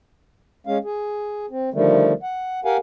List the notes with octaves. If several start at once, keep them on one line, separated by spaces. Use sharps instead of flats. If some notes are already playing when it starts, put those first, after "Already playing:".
G#3 C#4 F5
G#4
C4
D3 D#3 F3 G3 A3
F#5
G4 A#4 F5 F#5 G#5